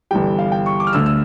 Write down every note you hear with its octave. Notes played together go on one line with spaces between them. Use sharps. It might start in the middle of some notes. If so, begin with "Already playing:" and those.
G1 G2 E3 G3 G5
F5
G5
C#6
D6
F6
D2 D3 A3 E6
E6